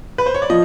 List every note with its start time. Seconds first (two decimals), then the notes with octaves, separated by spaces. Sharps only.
0.18 B4
0.26 C5
0.34 C#5
0.42 D5
0.50 F3 D#5